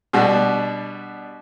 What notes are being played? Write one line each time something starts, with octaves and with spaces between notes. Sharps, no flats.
B2 G3 D4 F#4